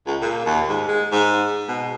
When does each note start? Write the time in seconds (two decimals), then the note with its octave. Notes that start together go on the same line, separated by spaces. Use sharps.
0.07 C#2
0.22 A#2
0.46 D#2
0.69 G#2
0.88 G#3
1.12 G#2
1.68 B2